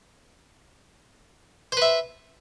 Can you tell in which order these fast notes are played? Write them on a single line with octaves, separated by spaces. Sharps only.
C5 B4 E5